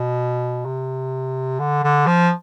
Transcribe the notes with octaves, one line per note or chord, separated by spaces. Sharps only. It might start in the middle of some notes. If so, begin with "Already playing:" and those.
Already playing: B2
C3
D3
D3
F3